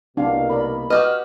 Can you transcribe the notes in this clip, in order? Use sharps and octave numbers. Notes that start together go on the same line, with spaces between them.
C2 B2 A#3 D4 F5
A#4 D5 B5
F#4 G4 B4 D#5 F6